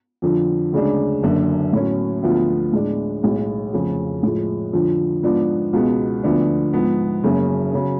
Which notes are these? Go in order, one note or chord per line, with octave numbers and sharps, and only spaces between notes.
F2 D3 F3
D2 C#3 G#3 D4
F#1 F#2 D3
A2 F#3 C#4
D2 D3 F3 B3 F4
A2 G#3 D4
B1 A2 G#3
F1 F2 C#3 F3
A2 F3 G#3
F2 D3 F3
G#2 F3 B3 D4 F4
C#2 B2 G#3 B3
D2 D3 F3 B3 D4
G#2 F3 B3
F#1 F#2 C#3
C#3 F#3